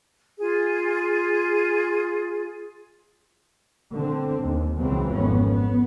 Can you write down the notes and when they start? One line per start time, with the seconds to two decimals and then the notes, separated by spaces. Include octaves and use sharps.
0.39 F4 G#4
3.92 D3 C4
4.42 D#2
4.79 C#2 C#3 E3 F#3 C4
5.11 G#1 F2 B3 C#4
5.50 B3